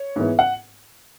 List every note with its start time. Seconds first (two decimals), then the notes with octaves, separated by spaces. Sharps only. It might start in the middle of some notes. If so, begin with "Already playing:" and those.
Already playing: C#5
0.16 G#2 E3 B3
0.39 F#5